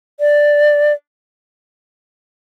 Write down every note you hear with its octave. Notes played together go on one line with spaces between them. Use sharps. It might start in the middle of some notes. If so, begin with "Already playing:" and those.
D5